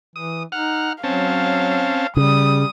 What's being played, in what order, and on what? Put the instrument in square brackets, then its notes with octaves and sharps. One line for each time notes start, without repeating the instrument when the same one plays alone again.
[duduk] E3 [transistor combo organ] D#6
[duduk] D#4 [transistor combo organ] F#5 F6
[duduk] F#3 [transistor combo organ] C4 C#4 A5 [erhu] F5
[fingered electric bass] C#3 [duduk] G3 [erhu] D#6